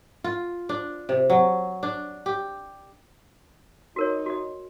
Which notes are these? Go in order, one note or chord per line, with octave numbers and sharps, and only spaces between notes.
F4
D4
C3
F#3
D4
G4
D#4 F#4 A#4 C#5
F#4 D#5